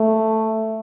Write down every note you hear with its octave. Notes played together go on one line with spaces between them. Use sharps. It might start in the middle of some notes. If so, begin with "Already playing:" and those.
Already playing: A3